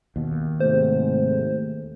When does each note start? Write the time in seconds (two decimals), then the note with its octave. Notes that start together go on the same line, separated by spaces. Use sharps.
0.16 D#2 B2
0.60 G#2 C3 A3 C5